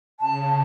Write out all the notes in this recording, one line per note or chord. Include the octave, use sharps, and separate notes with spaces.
C#3 A5